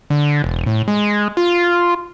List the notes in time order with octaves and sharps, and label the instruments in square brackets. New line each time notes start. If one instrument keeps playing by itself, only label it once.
[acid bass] D3
E1
A2
G#3
F4